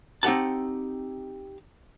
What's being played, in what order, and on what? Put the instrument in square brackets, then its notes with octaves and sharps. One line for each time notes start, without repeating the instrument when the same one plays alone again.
[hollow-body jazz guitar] C4 D#4 G4 F#5 A5